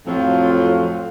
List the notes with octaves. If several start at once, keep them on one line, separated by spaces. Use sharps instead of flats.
F2 A2 F3 F#3 C4 F4